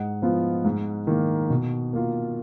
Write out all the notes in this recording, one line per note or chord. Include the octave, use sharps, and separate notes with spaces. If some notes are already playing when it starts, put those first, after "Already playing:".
Already playing: G#2 D#5 F#5
F3 B3 F4
G#2
D#3 A#3
B2
A#3 F4